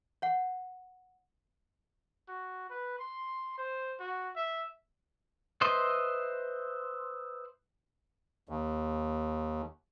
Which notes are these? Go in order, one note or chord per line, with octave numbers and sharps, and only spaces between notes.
C#5 F#5
F#4
B4
C6
C5
F#4
E5
B4 C5 D#5 E5 C6
D#2